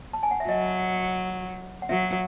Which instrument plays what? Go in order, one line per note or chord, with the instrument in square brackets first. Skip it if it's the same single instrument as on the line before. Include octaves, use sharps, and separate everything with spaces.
[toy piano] A5
G#5
F#5
E5
[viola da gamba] F#3 [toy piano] D#5
[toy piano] F#5
[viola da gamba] F#3 [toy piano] E5